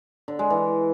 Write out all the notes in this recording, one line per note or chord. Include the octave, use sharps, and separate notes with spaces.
D3
G#3
E3